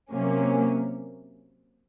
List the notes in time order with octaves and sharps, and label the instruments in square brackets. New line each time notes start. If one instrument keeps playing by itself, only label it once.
[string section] C3 F#3 A#3 C#4